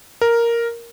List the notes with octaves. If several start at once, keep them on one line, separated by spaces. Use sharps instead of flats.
A#4